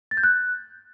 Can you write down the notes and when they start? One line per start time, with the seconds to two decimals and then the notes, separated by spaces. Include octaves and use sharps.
0.11 A6
0.17 G6
0.23 F#6